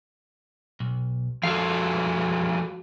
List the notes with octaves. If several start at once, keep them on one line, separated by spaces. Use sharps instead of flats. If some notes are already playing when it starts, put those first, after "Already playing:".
B1
F3 G#3 F#4 A4 F5